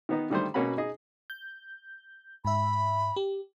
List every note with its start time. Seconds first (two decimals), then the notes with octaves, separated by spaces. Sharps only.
0.09 D#3 B3 D#4
0.30 D3 D#3 G3 A3 C5
0.54 B2 A#3 C#4 F#4 B5
0.78 D#4 G#4 D#5
1.30 G6
2.45 G#2 E5 B5
3.16 G4